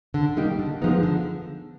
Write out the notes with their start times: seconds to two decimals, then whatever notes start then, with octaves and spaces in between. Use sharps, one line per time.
0.14 D3
0.37 G3 A#3 D#4 G4
0.59 D3
0.82 F3 G#3 B3 D#4
1.03 D3